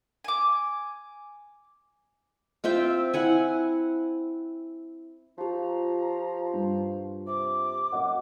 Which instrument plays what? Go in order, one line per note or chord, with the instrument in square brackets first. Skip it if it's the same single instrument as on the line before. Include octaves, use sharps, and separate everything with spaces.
[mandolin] G#5 D6
[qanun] C4 F4 E5 G5
E4 F#5 G#5
[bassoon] F3 [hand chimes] F4 G4 [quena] A#5
[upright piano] G2
[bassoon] C3 [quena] D6
[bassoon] F#2 [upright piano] D#5 F#5